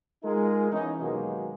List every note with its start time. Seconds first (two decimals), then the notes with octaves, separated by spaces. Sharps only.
0.23 G#3 D#4 F4 G#4 A#4
0.71 E3 B3 C#4 D#4
1.00 D#2 B2 F#3 G#3 A#3